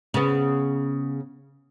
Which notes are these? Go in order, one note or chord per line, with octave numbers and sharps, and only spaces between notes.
C#3 B3